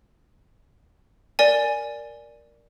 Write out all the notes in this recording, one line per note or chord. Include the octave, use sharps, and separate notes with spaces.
A#4 D5 G#5